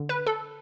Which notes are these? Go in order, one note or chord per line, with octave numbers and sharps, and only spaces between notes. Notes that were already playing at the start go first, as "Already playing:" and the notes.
Already playing: D3
B4
A4